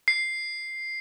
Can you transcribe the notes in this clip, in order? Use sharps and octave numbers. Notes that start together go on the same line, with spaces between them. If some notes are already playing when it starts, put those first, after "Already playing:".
C7